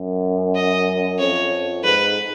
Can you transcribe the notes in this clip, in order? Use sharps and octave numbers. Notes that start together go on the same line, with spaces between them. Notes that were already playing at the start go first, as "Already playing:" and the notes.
Already playing: F#2
D#5
F2 C#5
G#2 B4